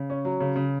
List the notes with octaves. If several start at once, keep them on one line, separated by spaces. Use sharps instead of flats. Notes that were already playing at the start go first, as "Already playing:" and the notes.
Already playing: C#3
C#4
F#3
C#3
C#3